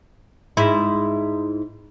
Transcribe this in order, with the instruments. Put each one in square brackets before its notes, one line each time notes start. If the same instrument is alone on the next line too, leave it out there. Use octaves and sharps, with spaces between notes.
[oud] G#2 E4